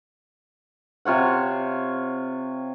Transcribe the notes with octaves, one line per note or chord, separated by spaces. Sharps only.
C3 F4 C#5 F#5